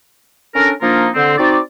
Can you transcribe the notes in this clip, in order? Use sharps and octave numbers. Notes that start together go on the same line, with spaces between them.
C#4 D4 A4 A#4
F3 A#3 D4 D#4 F4 A#4
D3 C4
C4 D#4 F#4 D5